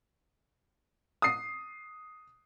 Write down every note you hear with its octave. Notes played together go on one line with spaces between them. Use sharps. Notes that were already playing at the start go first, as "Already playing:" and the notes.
D#6 C7